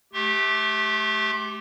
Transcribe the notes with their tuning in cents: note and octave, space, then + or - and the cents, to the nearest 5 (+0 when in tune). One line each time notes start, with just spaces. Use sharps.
A3 -25 G4 +0 C6 +40